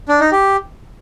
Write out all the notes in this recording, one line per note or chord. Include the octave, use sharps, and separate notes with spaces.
D4
D#4
G4